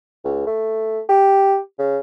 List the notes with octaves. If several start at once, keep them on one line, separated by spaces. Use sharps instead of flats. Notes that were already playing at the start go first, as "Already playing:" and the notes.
C#2
A3
G4
C#3